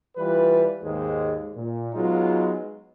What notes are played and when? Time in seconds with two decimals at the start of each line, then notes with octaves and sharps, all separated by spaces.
0.17 E3 G3 F4 B4
0.82 D#2 G#2 G#3
1.55 A#2
1.93 F#3 G#3 B3 D#4 F4